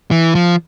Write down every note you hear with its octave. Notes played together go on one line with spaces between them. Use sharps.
E3
F3